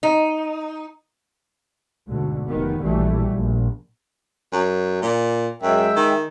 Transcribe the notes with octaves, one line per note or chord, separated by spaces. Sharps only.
D#4
D2 G#2 B2
F1 D#3 B3
A#1 B2 E3 G3 A3
A#1
F#2
A#2
F#2 G#3 E5 G5
D#3